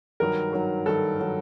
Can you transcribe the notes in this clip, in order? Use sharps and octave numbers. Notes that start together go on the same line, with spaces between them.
G2 D#3 F#3 A#4
G2 D#3 F#3
G2 D#3 F#3 A4
D#3 F#3